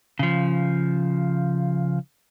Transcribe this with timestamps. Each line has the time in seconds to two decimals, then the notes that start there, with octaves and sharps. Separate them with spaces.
0.19 C#3 F3